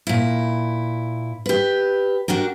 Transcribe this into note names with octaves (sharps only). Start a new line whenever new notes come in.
A#2 E4
G4 B4
D4 F#4 G4 A#4